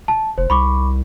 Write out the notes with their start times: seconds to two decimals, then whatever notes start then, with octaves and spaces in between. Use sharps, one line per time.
0.08 A5
0.38 F1 C5
0.50 C2 B5 C#6 D6